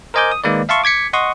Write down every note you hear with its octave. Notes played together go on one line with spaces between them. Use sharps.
A#4 C5 D#5 G#5 D6 G6
D#6
D#3 G#3 A#3 B4 D5
E5 F5 A5 C6 C#6
D6 G#6 B6 C#7
D#5 F#5 C6 C#6 D#6